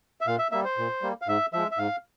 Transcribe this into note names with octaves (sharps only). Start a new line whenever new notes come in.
E5
A#2 F5
E5
G3 A#3 E5
C5
A#2
G3 A#3
F5
G#2 E5
F3 G#3 E5
E5
G#2 F5